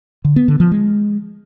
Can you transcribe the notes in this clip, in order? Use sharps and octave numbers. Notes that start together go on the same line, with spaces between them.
D3
B3
D3
F3
G#3